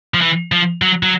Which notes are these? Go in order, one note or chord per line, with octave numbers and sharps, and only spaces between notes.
F3
E3
F3
F#3
F#3